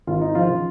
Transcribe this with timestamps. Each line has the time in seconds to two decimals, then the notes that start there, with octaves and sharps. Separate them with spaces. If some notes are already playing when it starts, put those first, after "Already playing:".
0.07 G#1 F4
0.21 D#4
0.35 F3 F4
0.48 C#3 F3